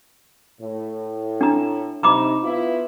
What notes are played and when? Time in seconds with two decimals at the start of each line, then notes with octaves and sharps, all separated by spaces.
0.61 A2
1.41 D4 A#5
2.03 C3 D#4 A#5 B5 D6
2.43 B3 E4 F4